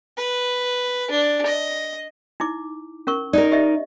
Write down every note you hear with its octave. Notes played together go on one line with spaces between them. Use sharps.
B4
D4
D#5
D#4 E4 D6
C#4 A#4 C#6
D#4 A#4 D5
G4 D#5 E5